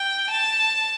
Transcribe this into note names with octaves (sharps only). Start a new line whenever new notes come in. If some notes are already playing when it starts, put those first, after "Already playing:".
Already playing: G5
A5